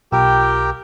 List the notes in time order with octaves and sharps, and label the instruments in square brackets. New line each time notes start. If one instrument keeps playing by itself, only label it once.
[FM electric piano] B1 F4 E6 [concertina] G4 A#4 G5